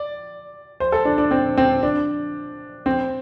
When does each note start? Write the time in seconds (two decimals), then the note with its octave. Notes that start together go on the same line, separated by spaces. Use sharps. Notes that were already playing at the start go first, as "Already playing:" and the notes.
Already playing: D5
0.80 C5
0.92 A4
1.05 D4
1.18 D4
1.31 C4
1.58 C4
1.83 D4
2.86 C4